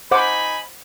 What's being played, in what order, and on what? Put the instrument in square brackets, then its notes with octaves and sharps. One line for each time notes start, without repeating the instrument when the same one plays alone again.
[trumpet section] D#4 G#5 B5 [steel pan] C5 F#5 D6